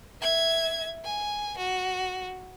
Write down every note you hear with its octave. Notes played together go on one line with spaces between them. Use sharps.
E5 G#6
G#5
F#4